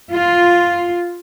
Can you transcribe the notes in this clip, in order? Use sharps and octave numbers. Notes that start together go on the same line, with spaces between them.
F4